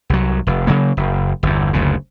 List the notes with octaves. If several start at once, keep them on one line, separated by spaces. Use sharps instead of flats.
C2 F#3
F1
C#3 F#3 A#3
F#1
G1 E2
F#1 D2 C#3